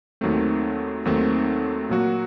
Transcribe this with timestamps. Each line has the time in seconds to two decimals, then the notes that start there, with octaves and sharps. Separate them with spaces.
0.21 D#2 D#3 F#3 A3 C4
1.05 D#2 D#3 F#3 A3 C4
1.89 A#2 F#3 A#3 F#4